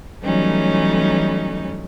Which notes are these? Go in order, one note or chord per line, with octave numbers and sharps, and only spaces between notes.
E3 F#3 G3 A3 C#4 D#4